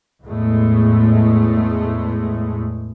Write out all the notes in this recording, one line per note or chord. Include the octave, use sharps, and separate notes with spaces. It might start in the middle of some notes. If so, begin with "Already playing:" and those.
E2 A2 G#3 A3